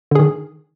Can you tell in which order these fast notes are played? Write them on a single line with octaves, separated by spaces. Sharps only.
D3 G#4 D#3